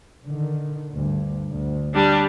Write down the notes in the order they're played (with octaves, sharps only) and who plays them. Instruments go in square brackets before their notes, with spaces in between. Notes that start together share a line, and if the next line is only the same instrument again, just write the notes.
[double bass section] D3 D#3
D2 G2
D2
[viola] G3 D4